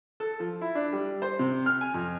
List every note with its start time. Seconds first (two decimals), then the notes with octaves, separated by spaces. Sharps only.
0.20 A4
0.40 F3
0.61 E4
0.75 D4
0.93 G3
1.22 C5
1.39 C3
1.66 F6
1.81 G#5
1.94 F2